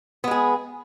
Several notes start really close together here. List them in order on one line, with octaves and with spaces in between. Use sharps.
B3 G#3 G#4